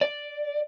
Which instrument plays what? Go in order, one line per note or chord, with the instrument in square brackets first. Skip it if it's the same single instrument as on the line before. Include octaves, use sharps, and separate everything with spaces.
[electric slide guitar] D5